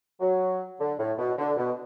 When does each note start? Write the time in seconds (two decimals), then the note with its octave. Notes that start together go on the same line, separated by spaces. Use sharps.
0.21 F#3
0.80 D3
0.99 A2
1.18 B2
1.38 D3
1.57 B2